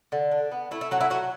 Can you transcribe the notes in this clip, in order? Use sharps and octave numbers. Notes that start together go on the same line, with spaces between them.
D3
D4
B3
A3 E4
E4
F#3 F#4
E4
F#3 F#4